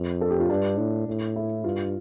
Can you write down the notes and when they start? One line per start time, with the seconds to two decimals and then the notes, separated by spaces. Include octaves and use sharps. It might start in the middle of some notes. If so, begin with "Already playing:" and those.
Already playing: F2
0.21 A4
0.30 G4
0.40 F4
0.50 G2 D4
0.79 A2
1.07 A2
1.36 E4
1.64 G2 F4